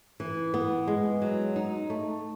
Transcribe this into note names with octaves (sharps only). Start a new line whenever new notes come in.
E3
B3
G#3
F#3
D#4
A3